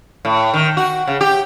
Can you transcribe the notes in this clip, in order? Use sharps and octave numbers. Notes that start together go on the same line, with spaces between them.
A2
D#3
F#4
C#3
G4